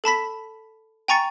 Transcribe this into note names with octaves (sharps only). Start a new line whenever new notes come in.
A4 A5 B5 B6
G5 G#5 A#5 C#6 A6 C#7